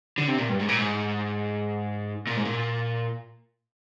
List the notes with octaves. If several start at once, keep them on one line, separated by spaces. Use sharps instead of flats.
D3
C3
A#2
G2
G#2
A#2
G#2
A#2
G#2
A#2